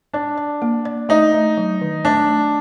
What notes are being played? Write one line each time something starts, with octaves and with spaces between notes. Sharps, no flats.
D4 D5
D5
A#3
D5
A3 D#4
A3
F#3
D#3
A3 D4
A3